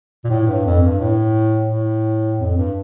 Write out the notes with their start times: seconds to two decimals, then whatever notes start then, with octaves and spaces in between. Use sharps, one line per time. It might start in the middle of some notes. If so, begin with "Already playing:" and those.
0.24 A#2
0.30 A2
0.47 G2
0.65 F2
0.82 G2
1.01 A2
1.69 A2
2.39 F2
2.56 G2